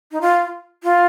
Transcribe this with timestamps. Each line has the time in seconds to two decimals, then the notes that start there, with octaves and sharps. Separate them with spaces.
0.11 D#4
0.21 F4
0.84 F4